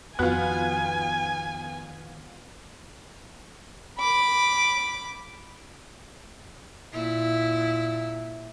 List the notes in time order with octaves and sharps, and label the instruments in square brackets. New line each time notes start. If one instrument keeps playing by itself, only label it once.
[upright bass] F2 D#3 [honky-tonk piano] B3 F4 [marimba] F#4 [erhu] G#5
[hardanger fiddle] B5 D6
[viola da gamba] A#2 E4